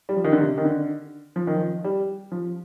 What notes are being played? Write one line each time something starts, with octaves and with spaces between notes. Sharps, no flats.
G3
F3
D#3
D3
C3
D#3
D3
F3
D#3
F3
G3
F3